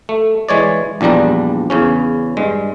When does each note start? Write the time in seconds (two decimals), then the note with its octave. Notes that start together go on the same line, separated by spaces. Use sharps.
0.09 A3
0.49 E3 G#3 C#5 D5
1.01 A#1 E2 G3 D4 A#5
1.70 E2 C#3 C#4
2.37 G2 G#3